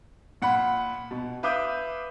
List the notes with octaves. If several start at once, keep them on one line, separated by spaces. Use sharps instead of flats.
A#2 F#5 B5
B2
B4 E5 F5 D6 D#6 G6